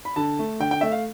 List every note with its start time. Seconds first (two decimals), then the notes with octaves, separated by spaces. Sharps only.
0.05 B5
0.16 D3 A5
0.39 A3
0.60 D3 G5
0.71 G5
0.81 A3 E5
0.92 F5